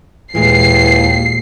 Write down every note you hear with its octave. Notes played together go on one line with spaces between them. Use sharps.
D#2 A#2 E3 G#3 C7